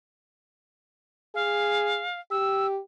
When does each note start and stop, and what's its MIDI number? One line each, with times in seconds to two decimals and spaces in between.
1.35 2.04 68
1.35 2.19 77
2.31 2.79 67
2.31 2.67 88